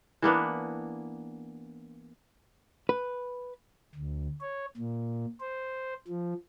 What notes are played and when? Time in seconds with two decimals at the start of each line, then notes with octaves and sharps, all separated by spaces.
0.22 E3 A#3 B3 D4
2.89 B4
3.95 D2
4.41 C#5
4.77 A#2
5.41 C5
6.08 F3